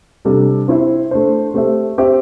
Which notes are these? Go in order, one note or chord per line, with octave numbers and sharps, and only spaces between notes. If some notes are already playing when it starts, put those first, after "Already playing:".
C3 G3 D4 A4
C4 E4 C5 E5
A3 D4 C5
A3 C4 G4 C5 E5
C4 G4 C5 E5